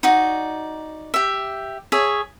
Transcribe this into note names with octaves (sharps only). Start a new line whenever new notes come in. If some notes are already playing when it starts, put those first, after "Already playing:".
D#4 F#4 D5
G4 E5
G#4 C#5 E5